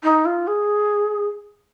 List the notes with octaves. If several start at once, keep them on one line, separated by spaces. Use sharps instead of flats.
D#4
F4
G#4